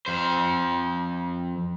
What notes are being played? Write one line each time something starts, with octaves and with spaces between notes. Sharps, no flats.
F2 C5